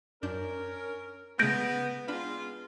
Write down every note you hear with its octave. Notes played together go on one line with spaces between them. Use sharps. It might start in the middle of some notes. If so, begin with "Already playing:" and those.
F#2 C#4 D4 A#4 G6
C#3 G#3 A3 B3 G6 A#6 D7
G#3 B3 D4 F4 B5